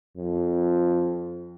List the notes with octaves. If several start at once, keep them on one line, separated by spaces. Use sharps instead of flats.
F2